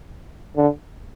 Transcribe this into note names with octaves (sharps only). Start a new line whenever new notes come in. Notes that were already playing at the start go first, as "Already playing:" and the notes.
D3